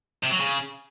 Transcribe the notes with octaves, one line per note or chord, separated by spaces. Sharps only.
C3
F#3
C#3